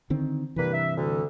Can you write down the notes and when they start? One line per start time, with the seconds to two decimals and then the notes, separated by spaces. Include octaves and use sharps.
0.10 D3 D#3 C4
0.56 G2 C3 E3 G3 A#3 B4
0.73 E5
0.96 D2 D3